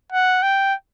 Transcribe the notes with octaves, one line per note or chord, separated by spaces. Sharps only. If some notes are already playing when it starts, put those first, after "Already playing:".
F#5
G5